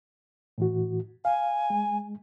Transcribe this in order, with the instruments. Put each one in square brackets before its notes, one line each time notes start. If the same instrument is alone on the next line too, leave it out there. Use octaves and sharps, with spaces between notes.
[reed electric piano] A2 E3 F#4
[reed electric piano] F5 [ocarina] G#5
[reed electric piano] G#3